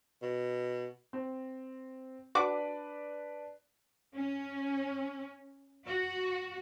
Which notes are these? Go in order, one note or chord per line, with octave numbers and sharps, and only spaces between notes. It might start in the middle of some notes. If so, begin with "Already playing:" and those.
B2
C4
D4 F#4 B4 D5 F#5 D6
C#4
F#4